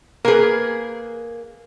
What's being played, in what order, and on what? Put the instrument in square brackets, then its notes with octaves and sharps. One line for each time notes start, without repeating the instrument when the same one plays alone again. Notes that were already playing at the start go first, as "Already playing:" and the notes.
[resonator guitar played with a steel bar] A#3 G#4 [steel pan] A#4 B4